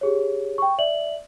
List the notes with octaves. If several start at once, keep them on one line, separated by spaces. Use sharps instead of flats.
G4 G#4 C#5
G5 C#6
D5 E5 F#7